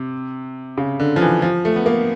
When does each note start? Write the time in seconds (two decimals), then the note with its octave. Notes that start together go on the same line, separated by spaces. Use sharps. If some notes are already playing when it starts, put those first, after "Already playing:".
Already playing: C3
0.77 C#3
1.00 D3
1.16 F3
1.21 E3
1.42 F3
1.65 A3
1.76 B3
1.86 A#3